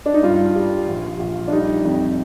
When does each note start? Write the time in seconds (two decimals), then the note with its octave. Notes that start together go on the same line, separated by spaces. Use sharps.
0.06 D4
0.14 D#4
0.23 G2 F4
0.55 G3
0.88 A#1
1.19 A#1
1.48 D4
1.52 G3 D#4
1.85 F2